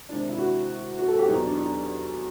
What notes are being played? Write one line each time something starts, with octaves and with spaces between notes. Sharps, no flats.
C3 D#3 G#3 D4
E4
F#4
F#4
A4
G4
E2 B2 F#3 B3 D#4
D4
D#4